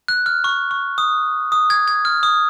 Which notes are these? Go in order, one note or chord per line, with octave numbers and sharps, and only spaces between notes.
F#6
F6
C#6
C#6
D#6
D#6
G#6
G#6
F6
D#6